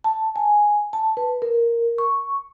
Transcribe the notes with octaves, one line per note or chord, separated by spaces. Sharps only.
A5
G#5
A5
B4
A#4
C#6